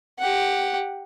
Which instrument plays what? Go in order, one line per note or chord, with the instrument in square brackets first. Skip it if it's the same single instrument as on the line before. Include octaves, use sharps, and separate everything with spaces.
[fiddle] G4 F#5